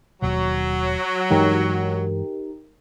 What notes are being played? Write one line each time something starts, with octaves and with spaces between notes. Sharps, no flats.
D#1 D#2 B2 F#3
G2 E3 G#3 D#4 G4 A#4